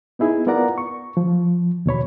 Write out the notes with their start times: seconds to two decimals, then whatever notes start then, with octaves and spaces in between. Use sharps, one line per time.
0.19 B3 D#4 E4 G#4
0.47 B3 F4 A#4 D5 F#5 A#5
0.78 C#6
1.17 F3
1.86 D#2 B2 C#5 B5